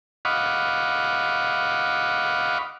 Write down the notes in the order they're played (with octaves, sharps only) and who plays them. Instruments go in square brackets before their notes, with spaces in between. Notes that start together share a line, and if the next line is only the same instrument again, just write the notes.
[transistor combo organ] D#5 F5 F#5 B5 C#6 D6